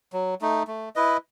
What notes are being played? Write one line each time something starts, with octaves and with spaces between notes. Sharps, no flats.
F#3
A3 D#4
A3
E4 B4 D#5